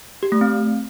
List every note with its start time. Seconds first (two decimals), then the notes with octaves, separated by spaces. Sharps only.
0.23 G4
0.32 A3
0.41 C4